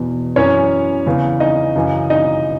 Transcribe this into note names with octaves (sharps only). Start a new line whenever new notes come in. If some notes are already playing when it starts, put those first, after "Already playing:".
Already playing: E2 B2
F#2 E3 C#4 C#5
E2 C#3 E3
D#4 D#5
F#2 C#3 E3
D#4 D#5